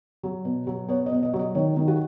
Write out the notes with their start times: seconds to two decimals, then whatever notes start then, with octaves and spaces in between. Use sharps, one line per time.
0.23 F#3
0.45 B2
0.67 F#3
0.88 B3 C#5
1.06 D#5
1.12 B2
1.23 D#5
1.33 F#3
1.39 D#5
1.55 D#3 C#5
1.77 D#3
1.88 F#4